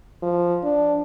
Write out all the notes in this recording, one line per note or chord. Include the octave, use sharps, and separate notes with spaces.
F3
D4